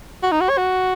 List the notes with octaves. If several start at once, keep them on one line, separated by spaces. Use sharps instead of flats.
F#4
D#4
F#4
C#5
F#4